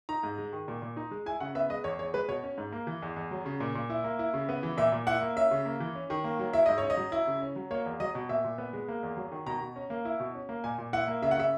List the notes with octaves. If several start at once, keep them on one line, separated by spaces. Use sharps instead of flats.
D#4 A#5
G#2
G#3
D#3
A#2
A#2
D#4
G#3
E4 G#5
C#3 F#5
B3 E5
G#3 D#5
E2 C#5
E2 C#5
G#3 B4
B2 C#5
C#4
G#2
A#3
E3
E2
E2
F#3
C#3
A#2
A#2
E4
A#3
E4
C#3
B3
E3
A#2 E5
A#2
E4 F#5
A#3
C#4 E5
C#3
A#3
E3
C#4
D#3
A#3
F#3
E4 E5
G#2 D#5
C#4 C#5
D#5
F#3
E4
C#3
C#4
F#3
A#3 C#5
E2
F#3 D#5
B2
A#2 E5
A#2
B3
G#3
A#3
E2
F#3
D#3
B2 A#5
B2
C#4
A#3
E4
B2
C#4
A#3
A#2 G#5
A#2
E4 F#5
A#3
C#3 E5
F#5
C#3 E5